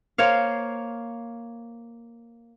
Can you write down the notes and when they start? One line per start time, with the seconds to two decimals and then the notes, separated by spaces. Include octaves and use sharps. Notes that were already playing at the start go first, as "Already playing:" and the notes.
0.18 A#3 C5 C#5 F5